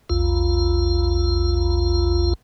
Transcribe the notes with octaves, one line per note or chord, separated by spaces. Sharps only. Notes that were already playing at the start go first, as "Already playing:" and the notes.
A#1 E2 F4